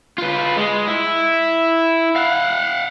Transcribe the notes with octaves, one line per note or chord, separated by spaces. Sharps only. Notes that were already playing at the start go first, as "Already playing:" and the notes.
F4 B4
G#3
E4
F5 F#5